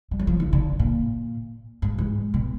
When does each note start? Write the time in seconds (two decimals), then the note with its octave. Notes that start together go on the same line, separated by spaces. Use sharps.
0.11 G3
0.19 F#3
0.27 F3
0.40 D#3
0.53 D3
0.79 A#2
1.82 G#2
1.98 G#2
2.34 B2